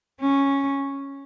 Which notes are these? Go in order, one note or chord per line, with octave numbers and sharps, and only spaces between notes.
C#4